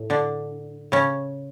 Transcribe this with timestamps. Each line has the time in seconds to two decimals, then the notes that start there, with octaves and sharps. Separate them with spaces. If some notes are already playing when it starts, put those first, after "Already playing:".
Already playing: A2
0.10 D3 D4
0.92 C#3 C#4